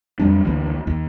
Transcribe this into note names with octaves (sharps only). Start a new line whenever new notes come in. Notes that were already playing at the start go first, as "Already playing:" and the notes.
F2 F#3 G3 D4
D2 E3 A#3
D#2